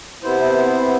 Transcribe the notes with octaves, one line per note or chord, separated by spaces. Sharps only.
C3 B3 E4 C5